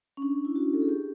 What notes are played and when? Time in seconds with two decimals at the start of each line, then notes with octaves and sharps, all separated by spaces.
0.17 C#4
0.22 D4
0.45 E4
0.56 F#4
0.74 A4
0.82 G#4
0.89 G4